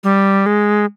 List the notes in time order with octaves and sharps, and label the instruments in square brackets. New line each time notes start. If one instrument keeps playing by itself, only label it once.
[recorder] G3
G#3